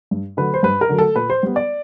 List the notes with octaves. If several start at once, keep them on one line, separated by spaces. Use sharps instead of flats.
G2
D3 F#3 A3 B4
C5
G2 B4
A#4
D3 F#3 A3
A4
A#2 B4
C5
G3 B3
D5